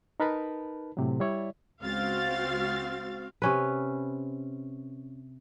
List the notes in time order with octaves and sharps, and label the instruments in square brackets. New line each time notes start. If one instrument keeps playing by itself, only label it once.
[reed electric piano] D#4 A#4 B4 A5 B5
A2 C3 F#3
G3 E4 C#5 D5 E5
[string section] C#2 A6 [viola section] C4 F#4 F5
[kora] C3 C#4 B4